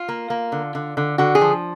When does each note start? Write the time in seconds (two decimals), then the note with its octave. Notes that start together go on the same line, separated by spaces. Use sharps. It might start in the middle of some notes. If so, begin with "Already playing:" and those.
Already playing: F4
0.08 A#3
0.30 A#3
0.52 D3
0.75 D3
0.97 D3
1.18 D3 F#4
1.35 G#4
1.41 F3